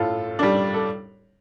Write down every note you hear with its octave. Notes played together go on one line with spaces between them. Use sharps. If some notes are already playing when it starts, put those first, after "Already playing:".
Already playing: A2 F4 A4
G3 D4
A4